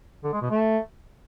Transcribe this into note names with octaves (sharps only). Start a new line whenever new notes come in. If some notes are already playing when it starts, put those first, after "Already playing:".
D3
G#3
B2
A3